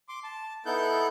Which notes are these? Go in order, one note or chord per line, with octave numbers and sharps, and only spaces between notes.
C6 D6
A5
B3 D#4 E4 A4 F#6 G6